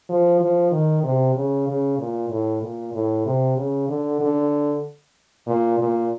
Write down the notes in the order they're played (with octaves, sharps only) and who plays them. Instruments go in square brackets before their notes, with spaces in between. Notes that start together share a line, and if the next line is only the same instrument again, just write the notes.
[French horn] F3
F3
D#3
C3
C#3
C#3
A#2
A2
A#2
A2
C3
C#3
D3
D3
A#2
A#2